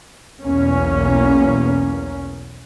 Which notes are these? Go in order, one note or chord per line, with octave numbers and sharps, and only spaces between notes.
B1 E2 A#3 C#4